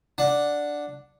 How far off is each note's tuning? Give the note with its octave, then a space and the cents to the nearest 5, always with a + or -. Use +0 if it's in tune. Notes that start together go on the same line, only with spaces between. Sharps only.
D4 +0 F#5 -10